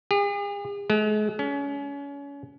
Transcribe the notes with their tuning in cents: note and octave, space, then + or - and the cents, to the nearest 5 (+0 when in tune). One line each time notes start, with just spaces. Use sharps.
G#4 -45
G#3 +40
C#4 +30